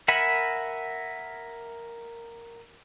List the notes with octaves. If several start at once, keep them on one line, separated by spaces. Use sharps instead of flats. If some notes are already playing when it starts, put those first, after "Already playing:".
A#4 E5 F#5 G#5 B5